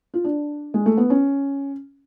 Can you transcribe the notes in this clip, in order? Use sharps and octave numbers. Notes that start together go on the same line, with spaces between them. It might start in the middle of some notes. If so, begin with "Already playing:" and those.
F4
D4
G#3
A3
B3
C#4